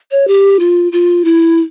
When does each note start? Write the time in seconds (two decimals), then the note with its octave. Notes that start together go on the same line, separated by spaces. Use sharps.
0.11 C#5
0.27 G4
0.59 F4
0.92 F4
1.24 E4